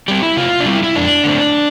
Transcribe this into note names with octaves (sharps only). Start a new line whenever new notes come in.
G3 C4 G4
E4
C3 F4
D4
G3 C4 E4
E4
F2 D4
D3 A3 C4